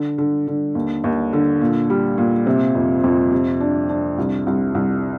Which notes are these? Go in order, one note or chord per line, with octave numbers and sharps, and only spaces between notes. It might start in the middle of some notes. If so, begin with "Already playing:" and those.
Already playing: D3
D3
D3
D#2
D#2
D3
A#2
G3
A#2
C3
F2
F2
C3
D4
D4
C2
C2
C2